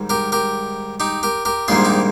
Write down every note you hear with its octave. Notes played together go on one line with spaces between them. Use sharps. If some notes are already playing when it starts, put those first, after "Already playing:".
Already playing: G#2 D#3 G3
G4 A#4
G4 A#4
D#4 G4
G4 A#4
G4 A#4
A#1 G#2 D#3 G3 A#3 F4 G#4
D#4 G4